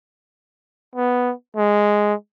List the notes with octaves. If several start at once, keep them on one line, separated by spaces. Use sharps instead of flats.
B3
G#3